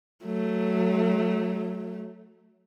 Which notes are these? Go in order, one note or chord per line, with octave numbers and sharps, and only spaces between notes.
F#3 A3